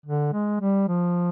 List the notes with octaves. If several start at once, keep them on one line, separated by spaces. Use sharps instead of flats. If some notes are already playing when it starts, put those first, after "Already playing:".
D3
G#3
G3
F3